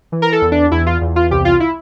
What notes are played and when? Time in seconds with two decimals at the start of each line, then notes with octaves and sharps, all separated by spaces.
0.12 E3
0.22 A#4
0.32 A4
0.42 E2
0.52 D4
0.72 E2 E4
0.86 F4
1.01 E2
1.16 F4
1.31 C2 G4
1.45 F4
1.60 E4